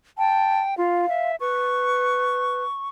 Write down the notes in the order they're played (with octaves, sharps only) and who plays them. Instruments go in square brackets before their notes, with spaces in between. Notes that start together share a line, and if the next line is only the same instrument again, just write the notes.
[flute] G5 [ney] A5
[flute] F4 [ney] F5
[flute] E5
[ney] B4 [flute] C#6